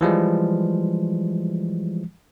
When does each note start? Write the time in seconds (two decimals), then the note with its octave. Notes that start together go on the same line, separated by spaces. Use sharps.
0.01 E3 F3 G3 G#3